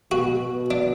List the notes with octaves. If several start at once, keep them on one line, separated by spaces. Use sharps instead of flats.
B2 F#4
B2
D4